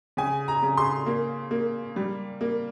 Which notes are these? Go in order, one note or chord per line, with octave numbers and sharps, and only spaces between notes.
C#3 G#5
A#5
C#3
C6
A#3
A#3
G3
A#3